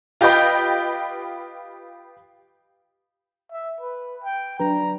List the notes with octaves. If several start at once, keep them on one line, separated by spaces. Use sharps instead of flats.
F4 G4 B4 D#5 G5 B5
E5
B4
G5
F#3 D4 B4 A#5